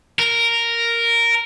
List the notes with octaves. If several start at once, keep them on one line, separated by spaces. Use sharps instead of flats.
A#4